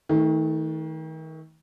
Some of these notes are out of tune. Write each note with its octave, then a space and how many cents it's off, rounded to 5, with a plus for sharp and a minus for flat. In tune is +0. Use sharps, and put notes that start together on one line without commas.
D#3 +35 A3 +0